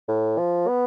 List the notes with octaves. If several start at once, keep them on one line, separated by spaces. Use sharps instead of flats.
A2
F3
B3